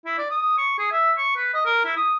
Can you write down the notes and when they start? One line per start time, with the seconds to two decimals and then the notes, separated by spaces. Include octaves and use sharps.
0.06 E4
0.18 D5
0.31 D#6
0.58 C#6
0.79 G#4
0.92 E5
1.18 C#6
1.37 B4
1.54 D#5
1.66 A#4
1.85 E4
1.96 D#6